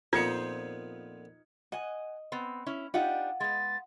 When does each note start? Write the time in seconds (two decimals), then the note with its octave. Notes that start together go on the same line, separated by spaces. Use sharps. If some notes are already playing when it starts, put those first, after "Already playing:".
0.13 F2 A#2 B3 D#4 F4 C5 G#6 C#7
1.72 D#5 F#5 G#5
2.32 B3 C4
2.66 C#4 E4
2.94 D4 D#4 F4 G4 F#5
3.40 G#3 B3 A6